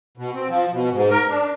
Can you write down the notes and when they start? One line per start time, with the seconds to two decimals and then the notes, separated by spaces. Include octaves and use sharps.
0.18 B2
0.34 C4
0.48 F3
0.72 B2
0.92 G#2
1.10 A#4
1.28 D4